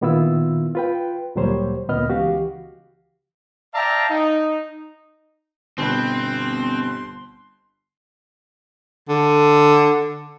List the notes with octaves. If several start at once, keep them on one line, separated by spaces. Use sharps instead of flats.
A#2 D#3 B3 E4 F4 E6
F4 B4 G5
D2 A#2 F#3 G3 C5 C#5
D2 A#2 B3 D#5 F6
C#2 E3 F#4 G4 F5
D5 E5 F5 G5 A5 A#5
D#4
G1 B2 C4 B4 C6
D3